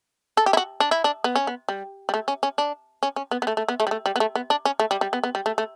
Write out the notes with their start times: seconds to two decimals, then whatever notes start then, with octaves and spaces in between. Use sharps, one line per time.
0.37 A4
0.46 G4
0.53 E4
0.57 F#4
0.80 D4
0.91 E4
1.04 D4
1.24 B3
1.36 C#4
1.47 B3
1.69 G3
2.09 G3
2.14 A3
2.28 C#4
2.43 C#4
2.58 D4
3.03 C#4
3.16 C#4
3.31 B3
3.42 B3
3.47 A3
3.57 A3
3.68 B3
3.80 A3
3.87 G3
3.91 A3
4.06 G3
4.16 B3
4.20 A3
4.35 B3
4.50 D4
4.65 C#4
4.80 A3
4.91 G3
5.01 G3
5.13 B3
5.24 B3
5.35 G3
5.46 A3
5.58 A3